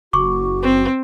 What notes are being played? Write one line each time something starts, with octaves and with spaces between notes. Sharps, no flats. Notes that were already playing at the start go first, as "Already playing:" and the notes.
F#1 F#4 C#6 D6
C4